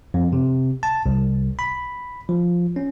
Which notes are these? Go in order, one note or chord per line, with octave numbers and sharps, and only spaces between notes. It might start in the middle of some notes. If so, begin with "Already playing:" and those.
F2
C3
A5
C2
B5
F3
C#4